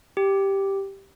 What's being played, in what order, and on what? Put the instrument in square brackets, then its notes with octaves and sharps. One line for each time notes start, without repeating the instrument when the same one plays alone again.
[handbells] G4